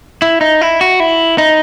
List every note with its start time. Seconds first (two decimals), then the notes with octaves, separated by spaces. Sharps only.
0.22 E4
0.41 D#4
0.61 E4
0.81 F#4
1.00 E4
1.38 D#4